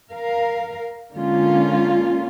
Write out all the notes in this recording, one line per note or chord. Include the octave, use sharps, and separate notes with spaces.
A#4 F5
D3 G#3 A#3 C#4 F4